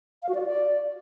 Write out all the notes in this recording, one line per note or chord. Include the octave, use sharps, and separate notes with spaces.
F5
F#4
D5
F#4
D5